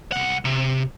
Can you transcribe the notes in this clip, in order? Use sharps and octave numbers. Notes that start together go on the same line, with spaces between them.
C2 F#5
C3